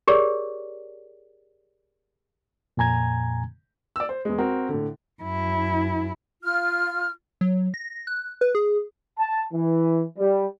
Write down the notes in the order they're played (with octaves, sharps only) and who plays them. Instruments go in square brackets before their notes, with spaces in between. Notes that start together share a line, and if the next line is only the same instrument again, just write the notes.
[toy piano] G4 G#4 A#4 C#5 D5
[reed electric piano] F2 A#2 G#5 A#5 G#6
[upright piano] D5 E6
C5
E2 G#3
C4 F#4 A#4
A2 D3
[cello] F#2 E4
[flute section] F4 F6
[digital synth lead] F#3
A#6
F#6
B4
G#4
[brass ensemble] A5
E3
G3